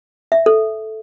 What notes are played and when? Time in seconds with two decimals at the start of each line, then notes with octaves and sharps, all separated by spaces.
0.32 E5
0.46 A4